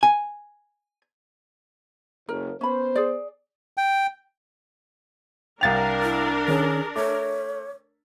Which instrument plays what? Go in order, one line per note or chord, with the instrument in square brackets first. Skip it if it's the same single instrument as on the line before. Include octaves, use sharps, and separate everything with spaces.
[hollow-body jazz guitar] G#5
[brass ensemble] F#1 [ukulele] A#4
[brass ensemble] B3 C5 [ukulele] C#4 B5
[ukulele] G#4 D5
[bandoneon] G5
[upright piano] C2 A6 F7 [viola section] D4 A#4 [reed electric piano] F5 G5
[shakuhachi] E4
[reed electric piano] D#3 C#4 [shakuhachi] G#4
[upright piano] A3 [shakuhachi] C#5 [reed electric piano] D6